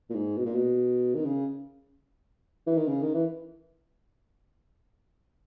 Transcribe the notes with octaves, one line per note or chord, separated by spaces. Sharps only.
A#2
G#2
B2
A#2
B2
D#3
C#3
E3
D#3
C#3
D#3
E3